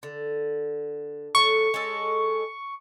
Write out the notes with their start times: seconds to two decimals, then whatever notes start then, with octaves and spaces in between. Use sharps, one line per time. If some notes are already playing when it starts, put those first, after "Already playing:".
0.03 D3
1.35 A2 F#3 A4 C#6
1.74 G#3 C#4 A4